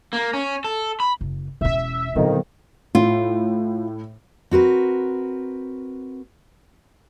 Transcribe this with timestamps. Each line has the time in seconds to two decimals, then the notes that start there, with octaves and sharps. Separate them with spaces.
0.13 A#3
0.33 C#4
0.64 A4
1.00 B5
1.21 F#1
1.61 E1 C#4 E5
2.16 F2 A#2 D3 D#3 F#3 B3 D#4
2.95 A2 F4
4.51 C4 F#4 A#4 B4